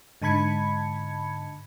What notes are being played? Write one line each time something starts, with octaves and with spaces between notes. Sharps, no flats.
G#2 D3 A5 B5 G#6 C#7